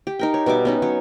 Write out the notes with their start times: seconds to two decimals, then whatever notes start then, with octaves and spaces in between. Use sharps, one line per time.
0.07 G4
0.19 D#4 A#4 G5
0.34 C#5
0.46 B2 G3 E5 D6
0.65 B3 C#4 D#4
0.82 F#3 C#5